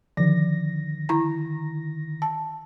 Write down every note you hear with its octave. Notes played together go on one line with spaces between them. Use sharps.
D3 D#3 F3 A#6
E4 A#5
A5